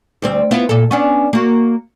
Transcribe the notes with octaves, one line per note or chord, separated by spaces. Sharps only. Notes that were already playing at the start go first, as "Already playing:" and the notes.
D2 G3 C4
B3 E4 F4
A#2 A4
B3 C#4 D4
A#3 F#4